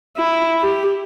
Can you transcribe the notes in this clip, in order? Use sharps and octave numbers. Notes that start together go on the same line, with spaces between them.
E4
G4